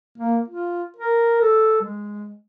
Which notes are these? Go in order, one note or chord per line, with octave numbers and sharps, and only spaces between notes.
A#3
F4
A#4
A4
G#3